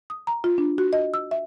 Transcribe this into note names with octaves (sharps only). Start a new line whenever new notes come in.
D#6
A#5
F4
D4
F#4
D#5
E6
E5